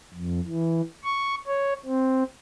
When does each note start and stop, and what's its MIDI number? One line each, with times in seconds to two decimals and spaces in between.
0.14 0.40 41
0.46 0.81 52
1.04 1.35 85
1.47 1.73 73
1.85 2.23 60